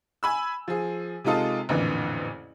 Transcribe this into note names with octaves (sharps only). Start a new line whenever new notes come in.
G#5 B5 E6
F3 G#4
C3 G#3 D#4 F4 A4 D#6
A1 F2 A#2 D3 E3